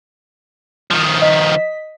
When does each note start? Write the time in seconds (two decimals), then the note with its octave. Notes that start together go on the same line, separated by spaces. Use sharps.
0.90 D#3 F3
1.22 D#5 B6